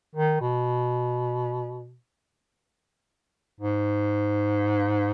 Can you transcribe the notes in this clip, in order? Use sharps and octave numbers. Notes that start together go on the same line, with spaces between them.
D#3
B2
G#2